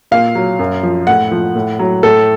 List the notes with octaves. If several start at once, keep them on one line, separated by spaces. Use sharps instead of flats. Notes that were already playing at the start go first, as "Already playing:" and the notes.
A#2 F5
F#3
F#2
F3
A2 F#5
F3
A2
F#3
A2 A4